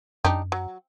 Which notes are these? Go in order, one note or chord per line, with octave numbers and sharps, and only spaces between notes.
F#2 D4 D#4 G4
F#3